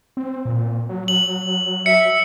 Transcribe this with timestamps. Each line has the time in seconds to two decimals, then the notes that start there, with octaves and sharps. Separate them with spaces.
0.17 C4
0.45 A#2
0.89 F#3
1.08 F#7
1.86 E5 C#7